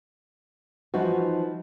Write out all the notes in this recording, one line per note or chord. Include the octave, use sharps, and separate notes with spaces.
E3 F3 D#4 F#4